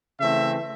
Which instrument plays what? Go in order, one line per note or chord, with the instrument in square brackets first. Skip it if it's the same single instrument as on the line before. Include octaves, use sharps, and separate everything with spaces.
[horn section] C#3 E3 A3 C4 E5